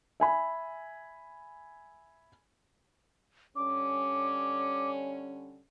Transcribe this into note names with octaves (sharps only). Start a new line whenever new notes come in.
E5 G#5 B5
D3 G3 C#4 D6